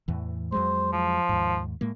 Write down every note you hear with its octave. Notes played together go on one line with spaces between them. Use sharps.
E2 A2 E3
F2 F#3 G#3 C5
F3
D#2 G#2
A2 G#3 A#3